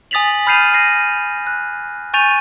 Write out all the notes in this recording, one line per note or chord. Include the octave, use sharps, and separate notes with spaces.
G#5 D#6 A6 B6 F7 F#7
B5 F6 G6 C7 D#7 F7
F6 A#6 C7 D#7
F#6
G#5 C#6 G6 A6 D#7 F7